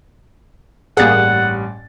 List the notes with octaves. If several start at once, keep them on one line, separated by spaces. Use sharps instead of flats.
A1 G2 A#3 G#4 F#5 A6